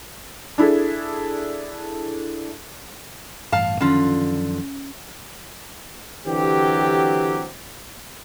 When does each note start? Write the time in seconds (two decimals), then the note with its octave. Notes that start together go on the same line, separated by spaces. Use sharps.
0.58 D4 E4 G#4 A4
3.52 A1 G2 F5 A5
3.81 F#2 D3 D#3 F3 C#4 F4
6.27 D3 E3 F#3 C4 G4